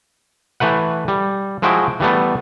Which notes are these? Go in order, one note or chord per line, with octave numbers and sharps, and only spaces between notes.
E3 A3 B4 F#5
G3
F3 G#3 E4 F#4 G5
E3 G3 A3 B3